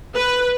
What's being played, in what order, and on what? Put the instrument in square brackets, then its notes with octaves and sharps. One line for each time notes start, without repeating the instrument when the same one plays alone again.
[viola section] B4